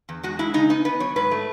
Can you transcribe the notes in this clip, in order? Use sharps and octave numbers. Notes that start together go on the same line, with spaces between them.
E2
G#3 F#4
G#3 E4
C#3 D#4
B3 D#4
B3 B4
F#3 C#5
G#2 B4
A3